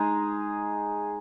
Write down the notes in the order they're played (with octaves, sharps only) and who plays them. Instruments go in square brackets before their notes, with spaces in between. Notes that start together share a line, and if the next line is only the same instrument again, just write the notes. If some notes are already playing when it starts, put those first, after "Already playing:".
Already playing: [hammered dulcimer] G#3 D#4 G#4